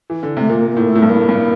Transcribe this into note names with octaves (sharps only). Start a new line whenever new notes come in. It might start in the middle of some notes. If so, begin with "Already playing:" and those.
E3
D3
C3 A3
A#2 A#3
A#3
A2
A3
A2
G2
A#3
G2